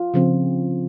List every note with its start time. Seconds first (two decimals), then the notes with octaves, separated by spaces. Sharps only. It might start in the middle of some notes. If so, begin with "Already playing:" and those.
Already playing: F4
0.14 C#3 F3 C4